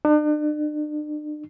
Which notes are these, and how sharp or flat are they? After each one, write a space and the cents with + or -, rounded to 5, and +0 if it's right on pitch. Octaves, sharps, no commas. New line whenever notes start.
D4 +40